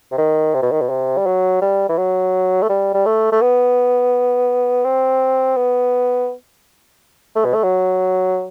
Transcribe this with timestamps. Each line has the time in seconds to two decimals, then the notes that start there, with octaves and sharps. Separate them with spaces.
0.11 C3
0.18 D#3
0.54 C3
0.62 B2
0.72 D#3
0.81 B2
0.89 C3
1.17 G3
1.26 F#3
1.61 G3
1.89 E3
1.98 F#3
2.62 A3
2.69 G3
2.94 G3
3.06 A3
3.32 A3
3.41 B3
4.85 C4
5.57 B3
7.35 A3
7.45 B2
7.54 A3
7.63 F#3